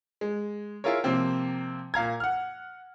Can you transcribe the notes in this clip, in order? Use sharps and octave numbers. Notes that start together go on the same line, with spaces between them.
G#3
E4 F4 G#4 A#4 C#5
C3 F3 A#3 C4
A#2 F5 A#5 G#6
F#5 F6